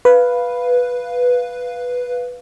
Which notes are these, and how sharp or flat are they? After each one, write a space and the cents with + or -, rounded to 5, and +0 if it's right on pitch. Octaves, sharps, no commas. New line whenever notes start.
B4 +0 F5 +0